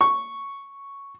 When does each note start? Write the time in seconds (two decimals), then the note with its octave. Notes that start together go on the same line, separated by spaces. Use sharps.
0.01 C#6